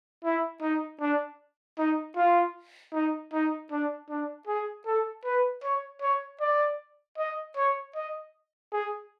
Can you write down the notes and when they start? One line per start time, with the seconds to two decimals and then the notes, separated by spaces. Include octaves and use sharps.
0.24 E4
0.62 D#4
1.01 D4
1.78 D#4
2.16 F4
2.93 D#4
3.33 D#4
3.71 D4
4.10 D4
4.48 G#4
4.86 A4
5.25 B4
5.63 C#5
6.02 C#5
6.40 D5
7.18 D#5
7.57 C#5
7.96 D#5
8.73 G#4